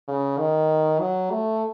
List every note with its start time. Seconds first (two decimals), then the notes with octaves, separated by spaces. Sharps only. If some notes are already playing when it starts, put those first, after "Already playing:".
0.08 C#3
0.39 D#3
1.00 F#3
1.31 A3